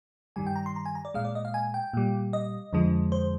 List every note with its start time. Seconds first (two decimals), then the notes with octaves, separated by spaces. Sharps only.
0.36 G2 D#3 G3 G#5
0.47 G5
0.56 A#5
0.66 C6
0.76 A#5
0.86 G#5
0.95 A#5
1.05 D5
1.14 A#2 G#3 F5
1.25 D5
1.35 D#5
1.45 F5
1.54 G#5
1.74 G5
1.93 A#2 G3
2.33 D#5
2.73 F2 D3 F3 G#3
3.12 C5